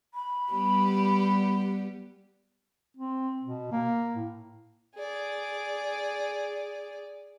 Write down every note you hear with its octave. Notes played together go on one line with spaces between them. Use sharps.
B5
G3 B3 G4
C4
B2
A#3
A2
G#4 D5